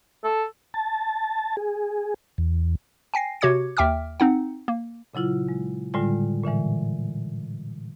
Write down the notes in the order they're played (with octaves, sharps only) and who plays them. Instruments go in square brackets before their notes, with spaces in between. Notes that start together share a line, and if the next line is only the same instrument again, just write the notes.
[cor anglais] A4
[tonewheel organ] A5
G#4
E2
[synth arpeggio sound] G5 G#5 A#6 C7
C3 F#4 C#5 D6 G#6 C#7
D#2 E5 G5 D6 F6
C4 D#4 F#5
A#3
[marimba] A#2 C#3 F#3 E4 F4
G#3
A2 D3 G3 G#3 F4
A#2 D3 E3 G#3